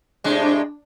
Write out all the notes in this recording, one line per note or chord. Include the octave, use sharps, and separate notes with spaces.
A2 C3 G#3 D4